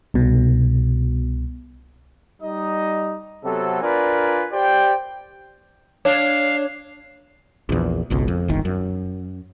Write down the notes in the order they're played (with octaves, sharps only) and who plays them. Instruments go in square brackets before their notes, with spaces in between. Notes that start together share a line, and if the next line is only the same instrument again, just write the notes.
[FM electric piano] C2 B2
[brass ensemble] G3 D#4 D#5
C3 F#3 B3 C4 A4
D4 F4 A#4 B4 D5 G#5
G4 C5 D5 G5
[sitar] D4 [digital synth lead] C#5 [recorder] F5
[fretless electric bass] A#1 E2
G#1 C#2 B2
F2
D1 G1 D#3
F#2